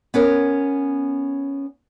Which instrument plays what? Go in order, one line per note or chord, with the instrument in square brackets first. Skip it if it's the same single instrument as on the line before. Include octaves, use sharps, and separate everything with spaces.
[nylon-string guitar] B3 C#4 A#4 C#5